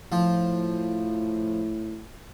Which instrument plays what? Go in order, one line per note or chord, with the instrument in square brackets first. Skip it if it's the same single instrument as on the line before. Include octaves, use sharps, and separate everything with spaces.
[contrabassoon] A2 [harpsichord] F3